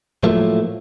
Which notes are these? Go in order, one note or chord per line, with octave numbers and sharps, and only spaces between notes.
A2 F3 F#3 A3 A#3